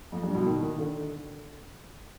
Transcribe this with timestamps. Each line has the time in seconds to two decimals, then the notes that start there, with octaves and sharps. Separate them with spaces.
0.12 F2
0.23 G2
0.35 B2
0.46 D#3
0.62 D#3
0.78 D3